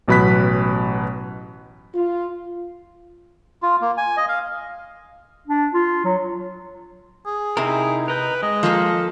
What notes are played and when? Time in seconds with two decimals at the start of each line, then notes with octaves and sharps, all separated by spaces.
0.08 A1 B2 F#3 B5 F#6 B6
1.94 F4
3.63 F4
3.82 A#3
3.98 G#5
4.17 D#5
4.29 F5
5.47 D4
5.74 F4
6.05 F#3
7.26 G#4
7.57 C3 D#4 E4 A#4
8.08 A#4 B4 D#5 G6
8.43 G#3 D#5
8.63 F3 A#3 A4